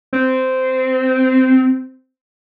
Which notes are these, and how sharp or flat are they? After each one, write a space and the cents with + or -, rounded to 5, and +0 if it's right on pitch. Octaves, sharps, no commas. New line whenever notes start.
C4 -15